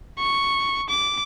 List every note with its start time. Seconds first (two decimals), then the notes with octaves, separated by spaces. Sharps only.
0.19 C#6
0.89 D6